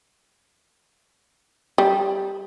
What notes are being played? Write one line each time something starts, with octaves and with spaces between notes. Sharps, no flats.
G3